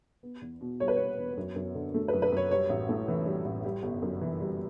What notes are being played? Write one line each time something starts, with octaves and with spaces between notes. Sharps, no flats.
B3
E2
B2
G3 C#5
B4
B3 C#5
E2
F#2
F#2
D3
A3
F#2 B4
B4
F#2 C#5
G3 C#5
A1
A2
E3
G3
A1
G3
G1
F#2
E3
G3